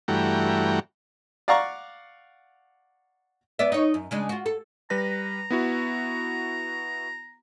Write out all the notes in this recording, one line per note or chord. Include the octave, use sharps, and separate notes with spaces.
G2 E3 A3 F#4 G5 A#5
D5 F5 F#5 A#5 C#6
B3 D5 E5
D#4 C#5
F#2
C#3 G#3 D4
F4 F#4
A4
G3 B4 A#5 A#6
B3 E4 F#4